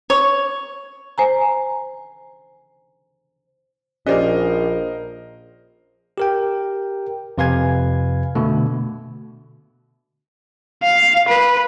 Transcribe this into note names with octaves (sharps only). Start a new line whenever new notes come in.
C#5
C5 G#5 A#5
A#1 C#4 G4 A#4 C5 D5 D#5
G4 A#4 G5
F2 C3 B4 F5 G#5 G#6
B2 D3 A3
F5
B4